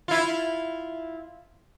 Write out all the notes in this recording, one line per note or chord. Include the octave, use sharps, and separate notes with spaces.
E4 F4